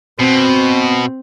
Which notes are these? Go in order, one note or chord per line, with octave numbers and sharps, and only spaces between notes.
B2 C4